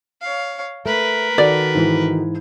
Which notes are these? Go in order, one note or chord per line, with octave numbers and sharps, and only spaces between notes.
C#5 F5
A3 A#4 B4
D#3 F#4 A4 D5
G#2 E3